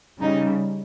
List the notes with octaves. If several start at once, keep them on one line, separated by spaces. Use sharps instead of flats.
C#3 G3 D#4